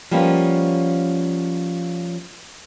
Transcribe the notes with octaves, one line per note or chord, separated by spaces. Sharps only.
F3 G3 A#3 B3 C#4